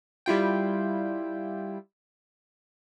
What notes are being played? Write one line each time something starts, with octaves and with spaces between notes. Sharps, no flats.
G3 E4 F4 G5